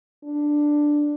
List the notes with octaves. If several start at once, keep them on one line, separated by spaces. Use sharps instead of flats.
D4